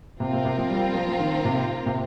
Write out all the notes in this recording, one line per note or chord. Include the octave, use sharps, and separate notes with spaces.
C3 C4 F4 A#4
C3
C3
F3
G3
F3
F3
D#3
C3
C3